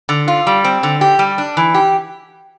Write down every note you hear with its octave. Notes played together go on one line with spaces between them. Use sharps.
D3
F4
G3
C4
D3
G4
G3
D4
E3
G4